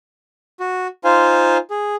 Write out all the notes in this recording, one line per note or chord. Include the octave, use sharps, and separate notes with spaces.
F#4
D#4 F4 C5 F5 G#5
G#4